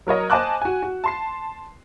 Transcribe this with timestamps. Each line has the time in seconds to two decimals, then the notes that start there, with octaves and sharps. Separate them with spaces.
0.07 F#3 A#4 C#5 D#5
0.30 C5 D#5 G#5 A5 D6 F#6
0.62 F#4 G#5
0.82 F#4
1.04 A5 C6 C7